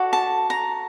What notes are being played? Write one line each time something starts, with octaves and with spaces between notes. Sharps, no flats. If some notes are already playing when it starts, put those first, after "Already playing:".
Already playing: F#4 A4 D5
A5
A#5